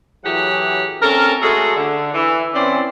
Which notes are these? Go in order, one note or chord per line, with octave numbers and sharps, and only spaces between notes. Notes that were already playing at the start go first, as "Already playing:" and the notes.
A2 E3 F#3 G4 G#4 F#5
A3 C4 C#4 A4 A#4
G#3 A3 F#4 G#4 A4
D3
E3
E3 C4 C#4 C5 D5